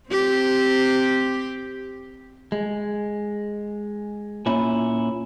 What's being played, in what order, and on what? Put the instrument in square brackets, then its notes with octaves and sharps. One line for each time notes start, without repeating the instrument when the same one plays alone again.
[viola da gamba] C4 G4
[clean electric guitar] G#3
A#2 C#4 E4